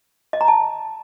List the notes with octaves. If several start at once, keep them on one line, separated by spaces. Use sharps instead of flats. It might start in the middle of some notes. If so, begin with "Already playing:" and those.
D#5
A#5
A5